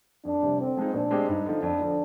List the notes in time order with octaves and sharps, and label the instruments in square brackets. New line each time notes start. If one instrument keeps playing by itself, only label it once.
[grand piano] F2 [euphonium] D4
[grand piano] C3 G3
[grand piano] D3 [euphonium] C4
[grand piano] F3 G#3 D#4
[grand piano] A#2 [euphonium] D4
[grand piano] G#3 C4 G4
[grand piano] G2 [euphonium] D#4
[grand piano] D3 F3
[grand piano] F2 [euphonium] D4
[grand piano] D3 F3